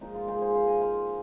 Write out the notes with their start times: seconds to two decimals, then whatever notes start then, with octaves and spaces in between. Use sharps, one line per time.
0.01 A#2 F3 G#3 D#4
0.14 F4
0.28 D#4 G#4
0.41 G#4 C5
0.54 C5 F5
0.67 D#5 G#5
0.81 C5 F5